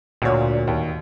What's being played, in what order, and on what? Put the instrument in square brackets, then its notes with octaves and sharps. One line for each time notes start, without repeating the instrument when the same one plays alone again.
[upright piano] D2 D4 C#5 [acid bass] A#2
[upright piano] D#2